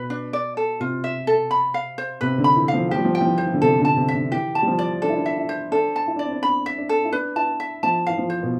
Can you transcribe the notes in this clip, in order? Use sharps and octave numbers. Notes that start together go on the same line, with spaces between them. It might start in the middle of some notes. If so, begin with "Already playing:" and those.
Already playing: B2 B4
D4
D5
A4
C3 F4
E5
A4
B5
F5
C5
C3 B4
D3
B5
E3
F5
F3
F3 G4
G3
F3
G5
F3
E3
C5
E3
D3
C3 A4
D3
A5
C3
E5
D3
E3 G4
A5
G3
F3
D5
D4 A4
E4
D4
E5
E4
C5
D4 A4
A5
E4
D4 D5
C4
D4
D4 B5
E5
D4
A4
E4
D4 B4
E4 A5
E5
F3 A5
E3 F5
F3
C5
B2